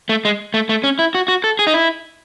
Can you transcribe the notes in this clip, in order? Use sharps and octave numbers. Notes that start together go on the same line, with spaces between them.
A3
G#3
A3
A3
C#4
E4
F#4
F#4
A4
G#4
D#4
E4